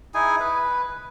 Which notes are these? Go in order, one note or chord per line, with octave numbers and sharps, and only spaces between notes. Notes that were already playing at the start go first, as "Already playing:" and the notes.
D#4 E4 G#4 G#5
B4